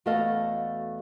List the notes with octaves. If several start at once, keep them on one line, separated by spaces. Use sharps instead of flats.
E2 A3 F#4 A4 D#5 F5